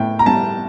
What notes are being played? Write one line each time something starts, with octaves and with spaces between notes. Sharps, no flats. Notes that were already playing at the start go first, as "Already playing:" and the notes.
Already playing: A2 G5
A#5
G3 A5